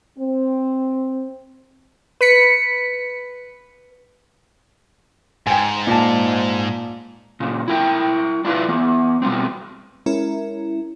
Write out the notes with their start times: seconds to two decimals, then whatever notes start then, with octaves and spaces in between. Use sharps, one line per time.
0.19 C4
2.21 B4 B6 C#7
5.47 G#2 G5 G#5
5.87 A#2 A5
7.40 A#2 C#3
7.68 E4 A#4 G5
8.45 D4 E4 F4 B4
8.68 E3 B3
9.22 B2 G3 B3 C4
10.06 G#3 C#4 E4 A#4